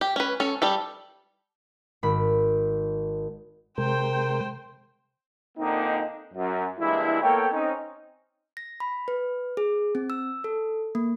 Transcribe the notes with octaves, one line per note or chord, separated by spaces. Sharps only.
G4
C#4 B4
C#4 A4
G3 G4 A4
G#1 B5
C3 G#3 A#4 C5 G5
A#2 D3 A#3 C4 D#4
F#2
E3 G3 G#3 A#3 D4 E4
A#3 B3 A4 C#5 G5
C4 C#4 D#4
A#6
B5
B4
G#4
C4
E6
A4
A#3